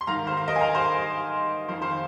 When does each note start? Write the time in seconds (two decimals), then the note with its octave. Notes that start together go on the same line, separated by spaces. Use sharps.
0.01 C6
0.07 G#2 D#3 F5 A#5
0.27 C5 F5
0.37 F5
0.48 A#4 D#5
0.56 G#5
0.61 F5 A#5
0.74 C5 F5
1.68 F2 C5 F5
1.73 D#3
1.82 C5 F5